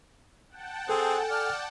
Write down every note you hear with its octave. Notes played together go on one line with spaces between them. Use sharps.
F#5 G5 A5
C4 G#4 A4 G#5
D5 F6